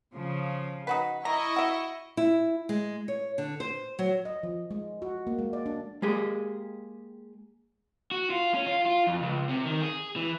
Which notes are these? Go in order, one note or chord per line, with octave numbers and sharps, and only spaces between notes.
C#3 F3
D#4 F#4 B4
E4 D#5 A#5 C#6
F#4 E5
E4
G#3
C#5
D3
C5
F#3
D#5
F3
G#3
F#4
A#3
G#3
D5
D4
G#3 A#3 G4 G#4
F#4
F4
C#4
F4
F4
F2
C#2
C3
D#3
G#4
E3